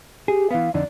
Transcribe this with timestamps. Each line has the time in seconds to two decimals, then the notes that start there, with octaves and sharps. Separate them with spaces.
0.28 G4 G#4
0.51 E3 B3 F5
0.74 F2 D3 D#4 D5